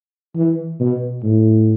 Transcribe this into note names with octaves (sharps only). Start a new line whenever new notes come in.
E3
B2
A2